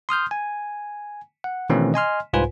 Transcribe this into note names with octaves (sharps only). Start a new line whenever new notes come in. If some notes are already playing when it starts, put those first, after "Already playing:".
C6 D#6 F6 G6
G#5
F#5
B2 D#3 E3 A3 C4 C#4
D#5 G#5 C6 F6
C2 G#2 F4 B4 C5 G#5